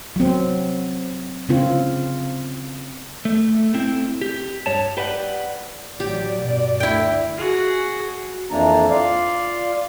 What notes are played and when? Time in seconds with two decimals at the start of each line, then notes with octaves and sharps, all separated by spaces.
0.16 F#3 C4
1.49 C#3 C4 F4
3.25 A3
3.74 A3 C4 E4
4.21 G4
4.66 G2 C#5 A5
4.97 G4 B4 D5 F#5
6.00 A1 F#3 G4 D5
6.41 G2 B2
6.80 D2 E4 G5
7.37 F#4 G#4
8.51 F2 E3 A#3 D4 A5 A#5
8.91 F4 D5 F5